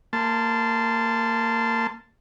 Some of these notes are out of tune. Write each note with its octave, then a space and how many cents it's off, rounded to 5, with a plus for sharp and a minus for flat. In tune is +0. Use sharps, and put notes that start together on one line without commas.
A#3 -20 A5 +0 C6 -20